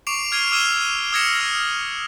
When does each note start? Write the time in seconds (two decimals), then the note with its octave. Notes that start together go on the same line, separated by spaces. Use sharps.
0.07 C#6 D6 C7 D7 E7 F7
0.31 D6 F6 G#6 C7 D#7 G7
0.52 D6 E6 F6 D#7 E7 G7
1.12 D#6 E6 G#6 A#6 C#7 E7
1.40 F6 C#7 D#7